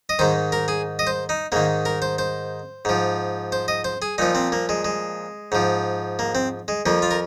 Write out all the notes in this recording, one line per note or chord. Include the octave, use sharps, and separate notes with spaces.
D#5
G#2 D#3 C5
A#4
G#4
D#5
C5
D#4
G#2 D#3 A#3
A#4
C5
C5
G#2 F3
C5
D#5
C5
G#4
A#2 F3 D#4
C4
A#3
G#3
G#3
G#2 F3
A#3
C4
G#3
F2 F3 A#3
F4
A#4